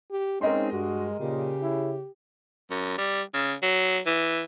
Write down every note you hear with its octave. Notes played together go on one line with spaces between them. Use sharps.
G4
G#3 C4 C#4 D#4 A#4 D#5 C6
G2 F#4
A#2 C#3 G4
E4
F#2
G3
C#3
F#3
E3